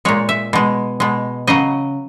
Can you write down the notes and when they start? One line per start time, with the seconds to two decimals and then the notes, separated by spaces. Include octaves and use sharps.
0.05 A#2 G#3 C#5
0.29 E5
0.53 B2 G#3
1.00 B2 G#3
1.47 C#3 F#3 D#5